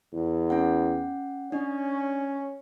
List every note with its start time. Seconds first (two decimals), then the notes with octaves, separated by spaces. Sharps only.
0.13 E2
0.50 C#4 F#5
1.52 C#4 D4 D#5